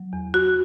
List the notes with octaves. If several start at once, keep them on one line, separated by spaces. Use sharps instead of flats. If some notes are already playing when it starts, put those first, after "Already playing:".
Already playing: F#3
E2
E2 F#4